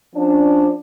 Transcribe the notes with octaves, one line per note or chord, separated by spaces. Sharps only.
F3 C#4 D4